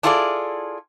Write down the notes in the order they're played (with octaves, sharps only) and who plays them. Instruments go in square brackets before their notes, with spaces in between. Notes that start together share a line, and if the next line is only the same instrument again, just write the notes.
[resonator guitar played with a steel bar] D4 E4 F4 G#4 A4 D5